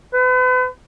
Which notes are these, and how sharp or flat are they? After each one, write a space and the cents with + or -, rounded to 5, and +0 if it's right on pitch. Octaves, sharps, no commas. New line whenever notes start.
B4 +40